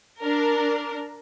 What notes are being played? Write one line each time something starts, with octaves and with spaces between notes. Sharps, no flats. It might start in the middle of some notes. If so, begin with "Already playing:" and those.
D4 A#4